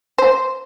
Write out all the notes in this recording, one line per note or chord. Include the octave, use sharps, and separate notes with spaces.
C5